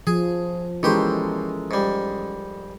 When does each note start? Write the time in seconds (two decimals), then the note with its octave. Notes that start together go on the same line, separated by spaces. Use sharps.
0.07 F3 G#4
0.83 B2 E3 G#3 C#4 G4 A4 A#4 C5
1.71 G#2 G3